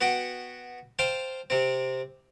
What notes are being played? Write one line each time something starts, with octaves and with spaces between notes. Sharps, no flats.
B3 F#4 F#5 G5
C5 F5 G5 A5
C3 C4